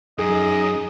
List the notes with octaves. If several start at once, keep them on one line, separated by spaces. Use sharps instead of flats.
F#2 D#4 G#4 D#5